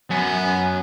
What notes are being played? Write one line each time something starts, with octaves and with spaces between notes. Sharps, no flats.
F#2 B3 G#5